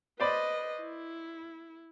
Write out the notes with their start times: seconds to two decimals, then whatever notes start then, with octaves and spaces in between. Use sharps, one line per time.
0.20 B4 C5 D5 D#5 B5
0.81 E4